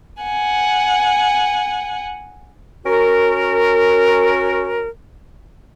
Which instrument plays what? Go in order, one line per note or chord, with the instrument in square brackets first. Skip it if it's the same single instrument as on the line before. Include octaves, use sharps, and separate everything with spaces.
[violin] F#5 G#5
[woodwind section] C#4 F#4 A#4